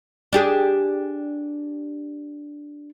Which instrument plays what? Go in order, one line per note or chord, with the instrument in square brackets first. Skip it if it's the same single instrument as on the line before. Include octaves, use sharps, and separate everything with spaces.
[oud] D4 G4 G#4